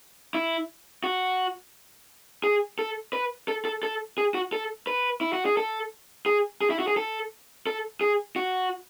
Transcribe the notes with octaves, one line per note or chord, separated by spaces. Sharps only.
E4
F#4
G#4
A4
B4
A4
A4
A4
G#4
F#4
A4
B4
E4
F#4
G#4
A4
G#4
G#4
E4
F#4
G#4
A4
A4
G#4
F#4